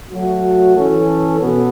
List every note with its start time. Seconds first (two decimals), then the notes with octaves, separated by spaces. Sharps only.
0.10 F#3 A3 F#4
0.75 E3 C#4 A4
1.40 B2 B3 F#4 A4